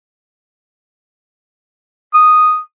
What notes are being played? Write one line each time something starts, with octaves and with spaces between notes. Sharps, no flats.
D#6